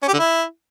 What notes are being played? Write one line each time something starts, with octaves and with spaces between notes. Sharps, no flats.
C#4
G4
D3
E4